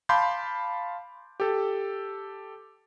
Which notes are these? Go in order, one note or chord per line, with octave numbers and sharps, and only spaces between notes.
F5 A5 B5 C6 D6 G6
G4 A4